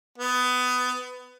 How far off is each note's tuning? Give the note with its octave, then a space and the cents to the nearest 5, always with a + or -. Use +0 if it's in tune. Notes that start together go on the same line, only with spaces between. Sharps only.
B3 +20